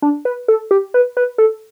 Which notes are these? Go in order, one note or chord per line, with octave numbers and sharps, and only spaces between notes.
D4
B4
A4
G4
B4
B4
A4